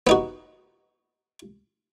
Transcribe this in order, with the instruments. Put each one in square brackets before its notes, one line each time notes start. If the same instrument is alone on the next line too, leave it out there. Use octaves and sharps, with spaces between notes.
[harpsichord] B3 D#4 F#4